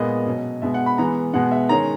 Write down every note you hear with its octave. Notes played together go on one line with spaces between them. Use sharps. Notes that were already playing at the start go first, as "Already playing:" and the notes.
Already playing: A#2 G#3 B3 D#5
B2 F#3 C#4
B2 G#3 B3 E5
F#5
B5
E3 G#3 B3 A#5
B2 G#3 B3 F#5
E5
D#3 G#3 C#4 A#5